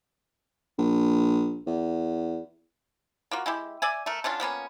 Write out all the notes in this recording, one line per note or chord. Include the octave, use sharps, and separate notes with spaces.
A#1
E2
A#3 F4 F#4
G#3 E4 G4
D5 E5 G#5
A3 A#4
D3 C#4 D4 F4
F3 A#3 B3 C#4